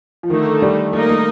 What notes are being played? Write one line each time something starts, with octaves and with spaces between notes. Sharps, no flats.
F3
D3 D#3 A3 D#4
G3
A3 A#3 D#4 A#4 D#5
A3